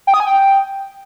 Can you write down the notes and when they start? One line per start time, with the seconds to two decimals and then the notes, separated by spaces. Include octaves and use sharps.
0.07 G5
0.14 D#6
0.20 G#5
0.27 G5